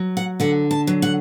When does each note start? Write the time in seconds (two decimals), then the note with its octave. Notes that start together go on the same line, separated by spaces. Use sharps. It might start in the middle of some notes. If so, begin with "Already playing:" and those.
Already playing: F#3
0.17 F#5
0.40 D3 F#5
0.71 A5
0.87 F#3
1.02 F#5